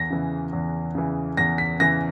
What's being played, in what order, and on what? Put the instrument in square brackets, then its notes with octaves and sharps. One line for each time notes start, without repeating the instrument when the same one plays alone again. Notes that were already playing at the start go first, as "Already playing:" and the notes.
Already playing: [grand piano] E2 A#6
C#3 E3
E2
C#3 E3
E2 A#6
B6
C#3 E3 A#6